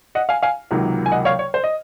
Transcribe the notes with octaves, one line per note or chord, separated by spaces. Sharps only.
D#5 F#5
F5 G#5
F5 G#5
C#2 C3 D#3 F#3 A#3
G#5
D#5 F#5
C#5 F5
C#5
C5
D#5